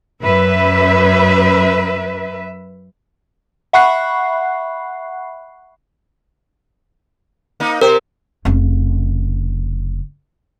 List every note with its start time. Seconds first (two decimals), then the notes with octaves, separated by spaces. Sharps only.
0.21 F#2 B4 E5
3.73 E5 F#5 B5 C#6 F#6 C7
7.60 A#3 D#4
7.81 C3 G4 A#4 C5
8.45 F1 C#3